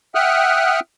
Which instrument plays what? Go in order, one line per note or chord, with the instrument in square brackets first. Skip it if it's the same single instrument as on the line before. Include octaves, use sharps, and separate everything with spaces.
[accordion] E5 F#5 G5 D#6 F6 F#6